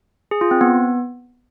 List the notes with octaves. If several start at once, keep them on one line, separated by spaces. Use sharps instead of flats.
G#4
F4
C4
B3